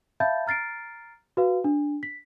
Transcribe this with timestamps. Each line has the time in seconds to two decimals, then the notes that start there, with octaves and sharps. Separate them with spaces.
0.20 E5 F5 A5 B5 G6 A6
0.46 A#5 F6 A6 C7 D7
1.37 F#4 B4 F5
1.64 D4
2.03 B6